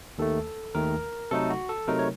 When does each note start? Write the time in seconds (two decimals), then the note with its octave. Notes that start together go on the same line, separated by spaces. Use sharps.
0.18 D#2 D#3 A3 A4
0.75 D#2 D#3 A3 A#4
1.31 C3 F#3 A3 D#4 A4
1.50 F#4
1.69 A4
1.88 C3 F#3 A3 D#4 A#4
1.99 C#5